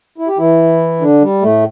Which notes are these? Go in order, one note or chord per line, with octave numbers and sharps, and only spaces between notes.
E4
G4
E3 E4
D3 D4
G3
A2 A3